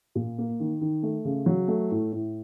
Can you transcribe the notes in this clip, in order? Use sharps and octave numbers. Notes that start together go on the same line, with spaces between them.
A#2
A#3
D#3
D#3
A3
C#3
F#3
A3
A2
A2